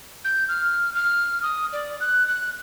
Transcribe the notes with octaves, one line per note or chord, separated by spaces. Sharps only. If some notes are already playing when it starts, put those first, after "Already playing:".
G6
F6
F6
D#6
D5
F#6
F#6